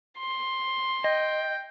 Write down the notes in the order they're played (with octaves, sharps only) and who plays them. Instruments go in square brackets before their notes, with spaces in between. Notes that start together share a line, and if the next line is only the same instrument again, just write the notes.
[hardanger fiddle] C6
[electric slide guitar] D#5 [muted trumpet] G5